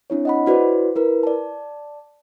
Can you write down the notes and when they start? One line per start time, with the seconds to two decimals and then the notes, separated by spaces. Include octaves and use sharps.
0.10 C4 D4 E4 C#5
0.25 D#5 F#5 B5
0.46 E4 F#4 B4 C5 D5
0.96 E4 A#4 B4
1.23 D5 A5